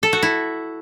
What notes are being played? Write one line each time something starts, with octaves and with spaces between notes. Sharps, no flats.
A4
F#4
E4